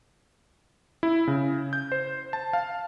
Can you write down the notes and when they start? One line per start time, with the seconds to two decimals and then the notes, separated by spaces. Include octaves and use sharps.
1.03 E4
1.27 C#3
1.73 G6
1.92 C5
2.33 A5
2.53 F5